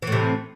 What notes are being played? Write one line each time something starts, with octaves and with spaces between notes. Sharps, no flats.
A2 C3 E3